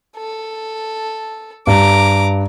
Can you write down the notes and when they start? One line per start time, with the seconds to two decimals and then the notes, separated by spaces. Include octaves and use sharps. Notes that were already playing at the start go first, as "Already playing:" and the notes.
0.17 A4
1.67 G2 A#5 D6